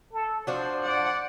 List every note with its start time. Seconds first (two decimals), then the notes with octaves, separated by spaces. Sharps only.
0.13 A4
0.47 F3 D4 F#4 C5
0.83 D5 F#5